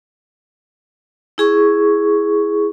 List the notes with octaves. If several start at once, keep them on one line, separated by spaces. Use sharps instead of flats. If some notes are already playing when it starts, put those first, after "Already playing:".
E4 G#4 C#6